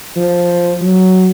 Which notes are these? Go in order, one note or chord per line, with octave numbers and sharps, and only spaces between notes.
F3
F#3